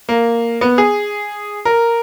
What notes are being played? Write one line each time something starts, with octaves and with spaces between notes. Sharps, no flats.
A#3
B3
G#4
A#4